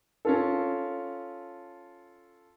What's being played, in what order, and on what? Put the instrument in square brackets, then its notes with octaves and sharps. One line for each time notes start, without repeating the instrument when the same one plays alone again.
[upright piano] C#4 F4 A4